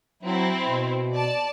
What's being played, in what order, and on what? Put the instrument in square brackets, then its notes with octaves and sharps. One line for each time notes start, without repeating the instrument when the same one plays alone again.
[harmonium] F#3 [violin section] C4 E4
[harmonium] B2
[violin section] D5 A5